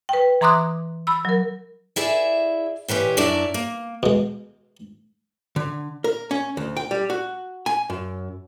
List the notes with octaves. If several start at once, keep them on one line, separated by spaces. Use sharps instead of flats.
B4 G5
E3 A#5 C6 D6 D#6 F#6
B5 E6
F#3 A#4
E4 G#4 D5 E5
A#2 E3 C#4 G4
F#2 F#3 D4 E4 D5 A5
A#3
B2 G#3
D3
A#4
C#4
D2
G5
G3
F#4
G#5
F#2